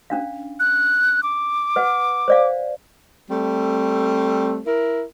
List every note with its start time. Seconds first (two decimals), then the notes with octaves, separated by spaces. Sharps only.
0.10 C#4 D4 F5
0.60 F#6
1.23 D6
1.76 B4 F#5
2.28 C5 D5 F5
3.31 G3 A3 C4
4.67 E4 A#4